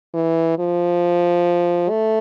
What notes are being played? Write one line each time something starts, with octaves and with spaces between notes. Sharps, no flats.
E3
F3
A3